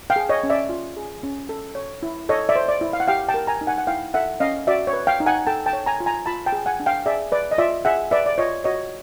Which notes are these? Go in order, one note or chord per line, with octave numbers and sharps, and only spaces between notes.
F5 G5
G#4
C#5 D#5
C#4
D5 E5
F4
G#4
C#4
A4
C#5
E4
A4 C#5 D#5
D5 E5
C5
D5
E4
F5
F#5
G4 F5 G5
G5 A5
A#4
G#5 A#5
D#4
F#5 G#5
F#5
E4 F5 G5
A4 E5 F#5
C#4 D#5 F5
F#4 D5 E5
C#5
B4
F5 G5
D#4
F#5 G#5
A4 G5 A5
G5 A5
C#5
G#5 A#5
F4
G#5 A#5
F4 A5 B5
G5 A5
G#4
F#5 G#5
D4
F5 G5
G#4 D5 E5
B4 D5
D#5
F4 D5 E5
G#4 E5 F#5
B4 D5 E5
D5
F4 C#5 D#5
F#4 C#5 D#5